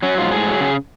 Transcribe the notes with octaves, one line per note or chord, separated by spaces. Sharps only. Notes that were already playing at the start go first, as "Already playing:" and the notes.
F#3 C#4
G#2 F4
A2 G#4
F#3
C#3